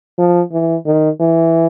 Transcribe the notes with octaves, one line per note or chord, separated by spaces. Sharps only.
F3
E3
D#3
E3